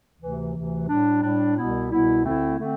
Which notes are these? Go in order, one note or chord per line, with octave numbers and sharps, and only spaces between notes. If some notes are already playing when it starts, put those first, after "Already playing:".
D2 C3 E3
D2 C3 E3
A2 G3 D4
A2 G3 D4
C2 B2 G3 B3 E4
C2 B2 G3 B3 E4
D2 D3 A3 C4 E4
D3 A3 C4